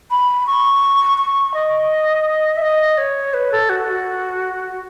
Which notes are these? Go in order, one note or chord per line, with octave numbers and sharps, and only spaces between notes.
B5
C#6
C#6
D#5
E5
D#5
C#5
B4
A4
F#4
F#4